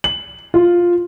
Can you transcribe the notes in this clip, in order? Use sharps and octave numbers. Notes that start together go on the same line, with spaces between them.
F#7
F4